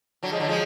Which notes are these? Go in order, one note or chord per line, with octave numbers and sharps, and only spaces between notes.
D3 F#3
F3 G#3
D3 F#3
F3 G#3